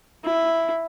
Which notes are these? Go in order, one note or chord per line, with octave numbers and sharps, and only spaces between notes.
E4